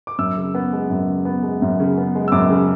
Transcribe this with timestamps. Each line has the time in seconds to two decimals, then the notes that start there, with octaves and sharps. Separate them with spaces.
0.07 D6
0.18 F#2 E6
0.37 C#3
0.55 B3
0.72 G#3
0.90 F#2
1.08 C#3
1.25 B3
1.43 G#3
1.62 F#2
1.80 C#3
1.98 B3
2.15 G#3
2.28 E6
2.32 F#2 D6
2.50 C#3